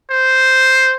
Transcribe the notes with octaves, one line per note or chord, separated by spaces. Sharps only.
C5